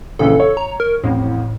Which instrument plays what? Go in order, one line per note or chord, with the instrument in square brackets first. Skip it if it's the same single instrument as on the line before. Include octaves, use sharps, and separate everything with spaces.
[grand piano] A#1 C#3 E3 [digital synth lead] A4
[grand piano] C#5
[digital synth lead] A#5
A#4
[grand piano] A1 F2 [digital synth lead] A2